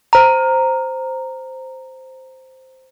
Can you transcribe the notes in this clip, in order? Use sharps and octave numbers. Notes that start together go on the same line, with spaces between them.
C5 A#5